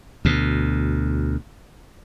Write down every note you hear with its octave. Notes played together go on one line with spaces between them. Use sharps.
D2 B2